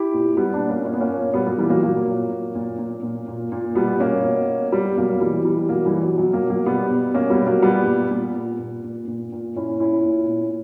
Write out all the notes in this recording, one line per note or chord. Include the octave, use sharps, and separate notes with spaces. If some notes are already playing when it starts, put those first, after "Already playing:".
Already playing: E4 G4
A#2
A#2 G3 B3
B3 D4
A#2
A#3 C#4
A#2 C#4
B3
A#3 C#4
A#2
A#2 G3 B3
F#3 A#3
A#2 E3 G3
F#3 A#3
A#2 F#3 A#3
A#2
A#2
A#2
A#2
A#2
A#2
A#2
B2 G3 B3
B2 A#3 C#4
B2
B2
B2 G3 B3
B2 F#3 A#3
B2 E3 G3
B2 E3 G3
B2 F#3 A#3
E3 G3
B2
F#3
B2 F#3
F#3 A#3
B2
F#3 A#3
B2 G3 B3
B2
B2 A#3 C#4
G3 B3
B2
F#3 A#3
A#2 G3 B3
A#2
A#2
A#2
A#2
A#2
A#2
A#2
A#2 C#4 E4
A#2 C#4 E4
A#2
A#2